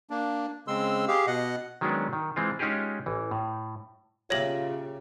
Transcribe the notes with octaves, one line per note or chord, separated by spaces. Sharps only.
A#3 D4
C#3 G#3 C4 C6 E6
G4 G#4 F5
B2 D#5 F#5
D#3 F#3 G#3 B3 C#4 D4
D#3
E3 G#3 C4 F4
G#3 C#4 D#4 F4 G4 G#4
A1 E3
A2
A#2 C#3 F4 G4 C#5 E5 A#6 F#7